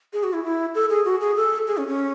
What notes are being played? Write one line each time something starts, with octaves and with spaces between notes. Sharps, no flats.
G#4
F#4
E4
E4
A4
G#4
F#4
G#4
A4
G#4
C#4
C#4